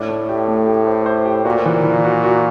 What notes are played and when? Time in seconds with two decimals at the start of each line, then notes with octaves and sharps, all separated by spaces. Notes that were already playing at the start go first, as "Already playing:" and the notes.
Already playing: A2 D4
0.09 A3
0.29 G4
0.48 A3
0.67 G4
0.87 C5
1.06 C5
1.26 G4
1.45 A#2 F#4
1.66 E3
1.84 E3
2.04 F#4
2.24 F#4